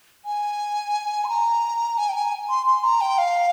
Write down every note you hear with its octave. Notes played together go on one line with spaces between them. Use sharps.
G#5
C6
A#5
G#5
G5
G#5
C6
C6
A#5
G5
F5